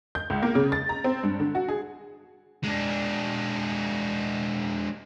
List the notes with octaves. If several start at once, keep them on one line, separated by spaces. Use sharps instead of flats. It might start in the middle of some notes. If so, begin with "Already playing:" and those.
G6
C#2
A#3
C#3
A6
A#5
C4
G2
D3
F#4
G#4
G#3 D4